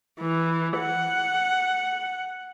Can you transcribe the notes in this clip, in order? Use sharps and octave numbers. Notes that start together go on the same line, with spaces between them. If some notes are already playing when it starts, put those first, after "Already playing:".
E3
F#5